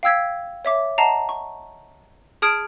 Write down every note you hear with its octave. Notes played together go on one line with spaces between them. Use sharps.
F5 G5 E6 G#6 B6
C#5 E5 D6
D#5 F#5 A5 A#5 C7
C#6
G#4 A5 D#6 F6 G#6 D7